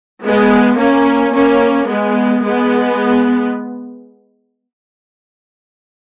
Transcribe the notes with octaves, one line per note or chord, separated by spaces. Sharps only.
G#3 B3
A#3 C#4
A#3 C#4
G#3 B3
G#3 B3